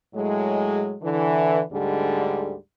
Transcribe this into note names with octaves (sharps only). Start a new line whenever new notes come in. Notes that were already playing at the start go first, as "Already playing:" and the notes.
A2 F#3 G#3
D3 E3
D2 G#2 D3 G3 G#3